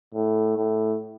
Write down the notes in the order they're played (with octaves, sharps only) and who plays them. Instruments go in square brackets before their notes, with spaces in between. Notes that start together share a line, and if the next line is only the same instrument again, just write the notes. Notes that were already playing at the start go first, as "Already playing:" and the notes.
[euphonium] A2
A2